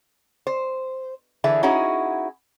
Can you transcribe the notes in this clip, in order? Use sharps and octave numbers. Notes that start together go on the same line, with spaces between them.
C5
D3 E3 G#4 E5
C#4 D#4 E4 F#4 G#4